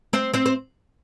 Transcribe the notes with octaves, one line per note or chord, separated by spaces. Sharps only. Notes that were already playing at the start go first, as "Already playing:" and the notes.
C4 C5
C4 C5
C5